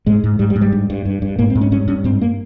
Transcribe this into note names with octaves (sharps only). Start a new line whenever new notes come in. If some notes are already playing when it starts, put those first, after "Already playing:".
G#2 G#3
G#2
G#2 G3
G3
G#2
G3
G2
G2
G2
G2
G#2 A#3
C4
G#2
C#4
G2 C#4
G2 C#4
G#2 C4
A#3